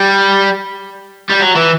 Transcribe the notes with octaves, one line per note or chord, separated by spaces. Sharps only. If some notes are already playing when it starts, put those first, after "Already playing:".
Already playing: G3
G3
F#3
E3